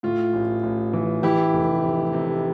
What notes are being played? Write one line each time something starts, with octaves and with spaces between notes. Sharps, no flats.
A2 F4
A1
A1
E3
E3 E4 G4
F1
F2
C3